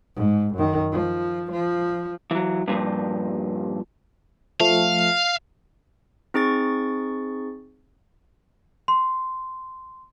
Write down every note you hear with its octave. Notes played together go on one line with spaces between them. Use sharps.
G#2
F#2 D#3
F3
F3
E3 F#3
G2 A#2 F3
F3 A3 F5
C4 D#4 G#4 C#6 A6
C6